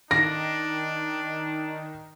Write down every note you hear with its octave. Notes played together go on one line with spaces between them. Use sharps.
D#3 D4 A#6